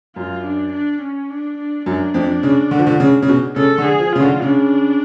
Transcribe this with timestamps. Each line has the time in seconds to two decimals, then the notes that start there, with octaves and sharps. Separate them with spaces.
0.16 F#2 F4
0.44 D4
0.73 D4
1.02 C#4
1.30 D4
1.58 D4
1.86 F#2 D4
2.14 F2
2.43 C#3
2.71 D3
2.79 F3
2.87 D3
3.00 C#3
3.22 C#3
3.28 B2
3.56 C#3 A4
3.78 D3
3.85 G#4
3.99 F3
4.13 C#3 F4
4.20 D3
4.42 C#3 D4